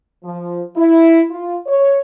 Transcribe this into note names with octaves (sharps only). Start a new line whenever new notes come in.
F3
E4
F4
C#5